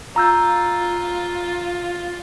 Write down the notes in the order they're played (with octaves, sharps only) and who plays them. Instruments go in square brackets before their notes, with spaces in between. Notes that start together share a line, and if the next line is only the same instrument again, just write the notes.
[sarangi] F4 [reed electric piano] A#5 E6 G6